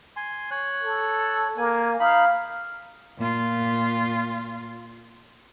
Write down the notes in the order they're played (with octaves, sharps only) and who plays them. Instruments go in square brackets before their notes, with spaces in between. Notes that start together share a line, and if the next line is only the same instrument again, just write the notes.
[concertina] G#5 C6
C#5 F#6
[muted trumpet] A4
[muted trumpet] A#3 [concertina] G#5
[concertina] D#4 B5 [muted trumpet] F5
[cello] A#2 F4